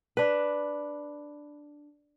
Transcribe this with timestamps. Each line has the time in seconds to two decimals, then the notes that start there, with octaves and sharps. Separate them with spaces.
0.17 D4 B4